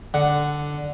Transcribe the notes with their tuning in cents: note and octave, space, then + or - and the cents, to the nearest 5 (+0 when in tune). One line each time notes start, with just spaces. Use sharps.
D3 +0 F#5 +0